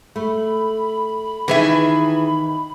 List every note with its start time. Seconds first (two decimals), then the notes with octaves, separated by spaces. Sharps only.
0.16 A3 B5
1.48 D#3 E3 G#4 B4 E5